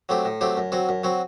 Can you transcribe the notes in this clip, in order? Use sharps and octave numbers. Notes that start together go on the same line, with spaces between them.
F#3 A3 C4 G4
A2
F#3 A3 C4 G4
F#2
F#3 C4 F#4
F#2
F#3 C4 F#4